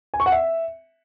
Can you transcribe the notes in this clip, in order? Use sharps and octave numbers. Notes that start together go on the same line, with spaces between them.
G#5
C#6
F#5
E5